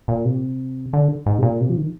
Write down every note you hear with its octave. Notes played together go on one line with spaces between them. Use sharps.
A#2
C3
D3
G#2
C3
A#2
C3
F3
D#3